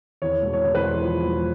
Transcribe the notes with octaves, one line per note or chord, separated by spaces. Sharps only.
E2 C#5
E1
C#5
E2
B4
E2 C5
F3
E1